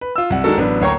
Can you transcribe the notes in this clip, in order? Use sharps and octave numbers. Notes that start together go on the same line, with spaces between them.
B4
F4 E6
C2 F#5
D#3 G#3 D4 F#4 A4 A#4
A1 F#3 B3 D4
D2 A#3 C#5 G5 A#5 C#6